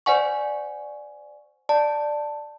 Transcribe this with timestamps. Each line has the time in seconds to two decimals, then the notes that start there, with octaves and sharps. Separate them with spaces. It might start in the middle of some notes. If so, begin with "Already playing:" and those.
0.06 C5 D5 F#5 G#5 C#6
1.69 D5 A5